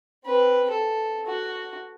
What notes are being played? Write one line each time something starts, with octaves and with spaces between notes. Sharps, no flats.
C4 B4
A4
F#4